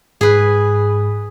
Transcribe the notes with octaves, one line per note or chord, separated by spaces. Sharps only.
G#2 G#4 B4